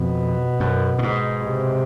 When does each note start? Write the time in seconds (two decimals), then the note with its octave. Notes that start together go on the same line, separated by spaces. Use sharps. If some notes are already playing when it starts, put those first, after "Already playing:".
Already playing: F2 B2
0.60 F#2
0.99 A2
1.03 G#2
1.44 C3